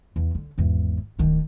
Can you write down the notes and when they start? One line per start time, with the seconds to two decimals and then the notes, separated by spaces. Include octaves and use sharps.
0.16 E2
0.35 D3
0.58 G#1 E2
1.19 D1 D#3